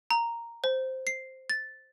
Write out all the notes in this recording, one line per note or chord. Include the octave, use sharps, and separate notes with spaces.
A#5
C5
C7
A6